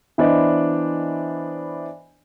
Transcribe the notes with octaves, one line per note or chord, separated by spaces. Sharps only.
E3 B3 D4 C5 D5 D#5